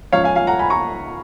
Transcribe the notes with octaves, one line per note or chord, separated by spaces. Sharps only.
C#2 C#3 F3 C#5 F5
F5 G#5
F5 G#5
F#5 A#5
G#5 B5
A#5 C#6